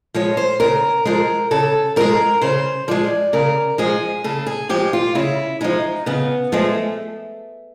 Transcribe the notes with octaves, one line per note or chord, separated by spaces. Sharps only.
F3 G#3 C#5
C5
C#3 A#4
F3 G#3 A#4
C#3 A4
F3 G#3 A#4
C#3 C5
F3 G#3 D5
C#3 A#4
F3 G#3 G#4
C#3 A4
G#4
F3 G#3 G4
F4
C#3 E4
F3 G#3 D#4
C#3 B3
F3 G#3 A3